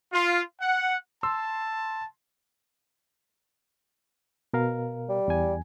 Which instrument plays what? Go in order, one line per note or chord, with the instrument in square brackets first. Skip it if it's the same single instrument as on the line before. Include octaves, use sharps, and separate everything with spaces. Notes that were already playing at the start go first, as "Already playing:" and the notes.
[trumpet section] F4
F#5
[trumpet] A5 [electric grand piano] C6 E6
[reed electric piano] B2 A#4 F5
[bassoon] G3
[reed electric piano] E2 G#5